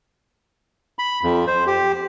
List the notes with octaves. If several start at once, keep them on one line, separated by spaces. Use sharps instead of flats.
B5
F2
C5
G4